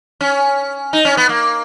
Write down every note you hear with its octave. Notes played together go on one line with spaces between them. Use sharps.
C#4
D#4
C#4
B3
A#3